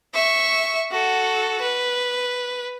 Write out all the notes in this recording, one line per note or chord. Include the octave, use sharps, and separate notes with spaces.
E5 C#6
F#4 A4
B4